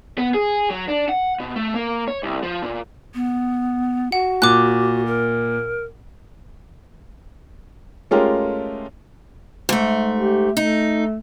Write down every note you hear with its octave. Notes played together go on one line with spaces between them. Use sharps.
B3
G#4
F#3
D4
F#5
B2
A3
A#3
C#5
C2
F3
A#2
B3
F#4 F#5
A#2 D6 F#6
A#4
G#3 A3 C#4 F4 G4 A#4
G#2 A3
G4
A3 D#4